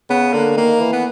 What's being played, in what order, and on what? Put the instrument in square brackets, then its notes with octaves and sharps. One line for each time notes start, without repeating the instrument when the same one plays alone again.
[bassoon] C#3 [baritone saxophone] B3
[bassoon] D3 [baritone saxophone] A#3
[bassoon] D#3 [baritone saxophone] A#3
[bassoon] E3
[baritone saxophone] B3